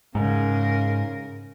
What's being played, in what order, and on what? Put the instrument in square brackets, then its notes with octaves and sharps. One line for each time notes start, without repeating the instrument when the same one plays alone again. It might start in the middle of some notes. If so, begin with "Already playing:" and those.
[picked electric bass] G#2 [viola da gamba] C#3 A#4